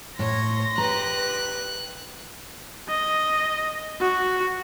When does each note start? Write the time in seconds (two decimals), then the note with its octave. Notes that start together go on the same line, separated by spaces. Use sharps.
0.19 A2 C#5 C6 A#6
0.78 G4 B4 A#5 F#6
2.89 D#5
4.00 F#4